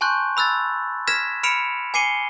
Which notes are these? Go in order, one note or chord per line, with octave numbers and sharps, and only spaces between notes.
G#5 A5 C6 C#6 F#6 G6
B5 E6 F#6 A6
F6 G#6 A#6 B6 E7
B5 F6 C#7 D7 E7 F7
G#5 D6 C7 C#7 D#7 G7